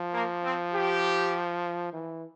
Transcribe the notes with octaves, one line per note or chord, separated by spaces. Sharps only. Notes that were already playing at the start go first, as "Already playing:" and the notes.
Already playing: F3
A#3
C4
G4
E3